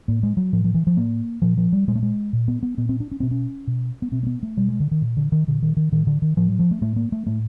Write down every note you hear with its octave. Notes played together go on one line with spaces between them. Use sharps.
A2 A#3
G#3
F#3
A2 F3
F3
E3
F3
A2 A#3
A#2 F3
F3
G3
A#2 G#3
A3
G#3
A#2
B3
B3
A#2 B3
C4
D4
C#4
B2 C4
C#4
B2
B3
B2 C4
A#3
B3
A3
B2 G3
G#3
D3
D#3
A#2
D3
D#3
A#2 D3
D#3
D#3
A2 D#3
D3
D#3
A2 F3
F#3
F3
A3
A2 A3
A#3
A3
A2 A3